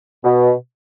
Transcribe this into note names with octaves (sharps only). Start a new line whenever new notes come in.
B2